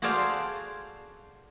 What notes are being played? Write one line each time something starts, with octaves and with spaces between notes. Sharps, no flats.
F#4 G#4 A4 C5 D5 F5